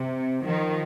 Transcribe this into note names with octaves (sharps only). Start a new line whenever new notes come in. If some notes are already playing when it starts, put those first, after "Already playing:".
Already playing: C3
D#3 F3